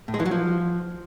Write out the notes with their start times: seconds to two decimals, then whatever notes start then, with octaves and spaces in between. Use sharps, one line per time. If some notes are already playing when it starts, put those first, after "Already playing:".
0.08 A2
0.14 G#3
0.20 E3
0.25 F#3
0.31 F3